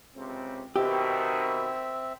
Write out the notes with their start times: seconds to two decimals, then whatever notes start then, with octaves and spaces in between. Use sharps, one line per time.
0.16 C#2 C3 C4
0.76 B2 D#3 C4 G4 E5